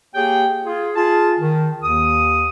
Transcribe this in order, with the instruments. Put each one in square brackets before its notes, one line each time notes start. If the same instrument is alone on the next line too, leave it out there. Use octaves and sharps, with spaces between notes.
[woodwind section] A#3 G4 G#4 C#5 G5
F4 G#4
F4 G#4 A5
D#3
D#2 D#6